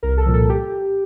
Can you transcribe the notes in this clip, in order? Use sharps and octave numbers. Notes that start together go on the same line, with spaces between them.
C2 A#4
A4
A#2 F3
A4
G4